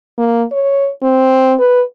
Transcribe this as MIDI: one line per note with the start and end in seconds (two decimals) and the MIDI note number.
0.18 0.44 58
0.52 0.90 73
1.02 1.54 60
1.59 1.83 71